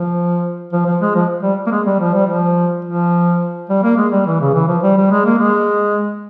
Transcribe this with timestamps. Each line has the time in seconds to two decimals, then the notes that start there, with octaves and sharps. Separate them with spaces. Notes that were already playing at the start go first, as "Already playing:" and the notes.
Already playing: F3
0.73 F3
0.86 F3
1.01 G#3
1.15 F3
1.43 G3
1.67 A#3
1.71 G#3
1.86 G3
2.00 F3
2.14 G3
2.26 F3
2.85 F3
3.69 G3
3.83 A#3
3.97 G#3
4.12 G3
4.26 E3
4.40 C#3
4.54 E3
4.68 F3
4.83 G3
4.97 G3
5.11 G#3
5.25 A#3
5.39 G#3